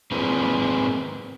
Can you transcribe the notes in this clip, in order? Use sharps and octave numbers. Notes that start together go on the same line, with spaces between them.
C4 G#4 A#4 B4